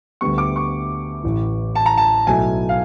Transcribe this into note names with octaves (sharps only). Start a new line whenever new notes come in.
D2 D3 G3 B3 C#6
D6
C#6
A1 A2 E3
A5
A#5
A5
B1 A2 F#3 A3 G#5
F5